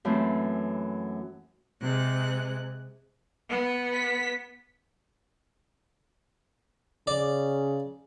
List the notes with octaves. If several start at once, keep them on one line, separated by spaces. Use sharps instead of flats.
F#2 E3 A3 C4
C3 G#3 F#6
B3
B6
C#3 D5